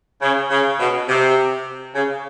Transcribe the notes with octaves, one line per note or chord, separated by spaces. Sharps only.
C#3
C#3
B2
C3
C#3